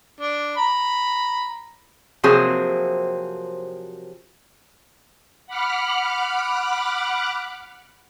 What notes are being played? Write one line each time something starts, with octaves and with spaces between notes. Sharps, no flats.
D4
A#5 B5
C3 F3 F#3 A#3 C4 G#4
F#5 B5 D6 F6 F#6